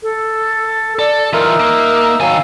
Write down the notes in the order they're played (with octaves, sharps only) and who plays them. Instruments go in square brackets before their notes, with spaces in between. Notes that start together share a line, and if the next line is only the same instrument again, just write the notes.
[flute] A4
[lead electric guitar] A4 [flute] D5
[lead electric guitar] E3 F4 [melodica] D#4 E5 [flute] A#4
[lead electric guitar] A#3
[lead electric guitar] D#3 G#5 [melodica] F#3 E6 [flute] F5